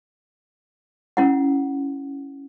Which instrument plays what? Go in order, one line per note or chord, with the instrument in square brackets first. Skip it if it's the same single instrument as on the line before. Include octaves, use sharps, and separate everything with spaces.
[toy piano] C#4 E4 F#5